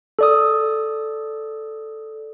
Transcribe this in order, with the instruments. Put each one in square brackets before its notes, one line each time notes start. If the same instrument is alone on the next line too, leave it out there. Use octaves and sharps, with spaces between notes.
[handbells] A4 D5 D#6